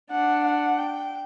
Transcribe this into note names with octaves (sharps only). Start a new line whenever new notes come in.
D4 F#5
F#5
G5